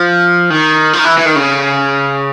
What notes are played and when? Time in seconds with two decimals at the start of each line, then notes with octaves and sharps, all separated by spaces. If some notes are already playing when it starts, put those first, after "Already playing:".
Already playing: F3
0.50 D#3
0.93 F3
0.99 D#3
1.04 E3
1.18 E3
1.25 D#3
1.36 C#3